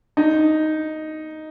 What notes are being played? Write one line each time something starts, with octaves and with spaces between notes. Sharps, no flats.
D#4